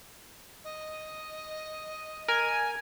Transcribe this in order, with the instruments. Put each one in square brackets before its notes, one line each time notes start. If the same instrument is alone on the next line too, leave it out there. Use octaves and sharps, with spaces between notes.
[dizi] D#5
[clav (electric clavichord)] A#4 [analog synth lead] G#5